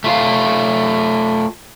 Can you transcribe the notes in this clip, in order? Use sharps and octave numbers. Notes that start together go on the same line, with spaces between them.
A3 F4 F5